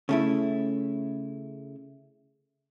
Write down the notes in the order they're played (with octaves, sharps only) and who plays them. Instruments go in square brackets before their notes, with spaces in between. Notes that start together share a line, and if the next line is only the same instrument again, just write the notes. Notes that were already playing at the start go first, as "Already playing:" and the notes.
[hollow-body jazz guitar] C#3 A3 E4